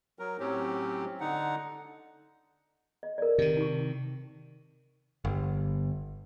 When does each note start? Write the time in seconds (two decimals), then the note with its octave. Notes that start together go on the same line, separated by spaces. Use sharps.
0.19 F#3 A#4
0.40 A2 F#3 C4 C#4 G4
1.20 D3 D#4 F#5
3.03 D#5
3.18 A#4 D5
3.38 C3 D#3
3.57 D#4 C#6
5.25 G1